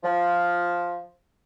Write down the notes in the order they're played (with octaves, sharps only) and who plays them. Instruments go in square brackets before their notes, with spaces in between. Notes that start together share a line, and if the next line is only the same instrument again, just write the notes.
[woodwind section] F3